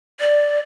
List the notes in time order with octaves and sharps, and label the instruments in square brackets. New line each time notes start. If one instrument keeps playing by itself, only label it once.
[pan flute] D5